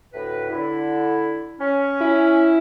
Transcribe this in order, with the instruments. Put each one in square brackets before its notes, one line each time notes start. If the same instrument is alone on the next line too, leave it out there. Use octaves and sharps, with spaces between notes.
[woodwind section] D2 A2 B4
D3 E4
C#4
[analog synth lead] E4